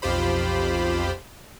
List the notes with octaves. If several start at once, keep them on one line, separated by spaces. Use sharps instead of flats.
B1 F2 F4 G4 C5 B5